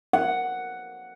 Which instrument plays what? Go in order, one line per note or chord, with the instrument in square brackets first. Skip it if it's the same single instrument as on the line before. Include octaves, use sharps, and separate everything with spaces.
[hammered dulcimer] F#5